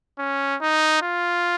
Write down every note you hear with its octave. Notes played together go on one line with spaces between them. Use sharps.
C#4
D#4
F4